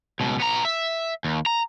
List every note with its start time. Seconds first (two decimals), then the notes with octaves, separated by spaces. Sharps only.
0.20 C#2 B2
0.40 B3 A#5
0.65 E5
1.24 D#2
1.46 A#5